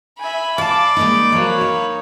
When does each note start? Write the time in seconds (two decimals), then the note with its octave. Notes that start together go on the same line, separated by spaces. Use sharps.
0.19 E5 G#5 B5
0.58 D5 F5 A5 D6
0.97 G#3 A#3 D#4
1.32 F3 F#3 A#3 C#5
1.61 D#4